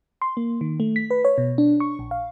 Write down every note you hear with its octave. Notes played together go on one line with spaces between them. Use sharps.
C6
A#3
D#3
A3
B6
B4
C#5
B2
D4
C#6
A#1
F5